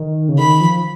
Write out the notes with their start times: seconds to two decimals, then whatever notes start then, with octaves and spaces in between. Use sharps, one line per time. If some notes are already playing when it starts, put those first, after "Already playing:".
Already playing: D#3
0.29 C#3
0.38 D#3 B5
0.60 F3